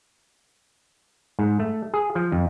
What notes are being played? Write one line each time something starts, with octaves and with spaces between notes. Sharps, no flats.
G#2
A3
G#4
F3
F2